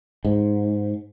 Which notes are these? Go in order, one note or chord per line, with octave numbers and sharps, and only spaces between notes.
G#2